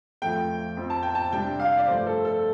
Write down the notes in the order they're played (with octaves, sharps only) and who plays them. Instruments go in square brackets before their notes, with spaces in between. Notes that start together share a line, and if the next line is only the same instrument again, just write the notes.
[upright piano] F2 F3 A3 G5
F2 F3 C4
A5
G5
A5
C3 G3 D4 G5
F5
D5
G2 F3 A3 C5
A4
A4